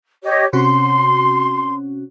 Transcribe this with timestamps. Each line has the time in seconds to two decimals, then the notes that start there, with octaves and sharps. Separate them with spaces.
0.23 G4 C#5 D#5
0.53 C3 C#4 F#4 C6